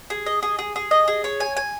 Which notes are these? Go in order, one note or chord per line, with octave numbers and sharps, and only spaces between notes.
G#4
D#5
G#4
G#4
G#4
D#5
G#4
C#5
G#5
G#5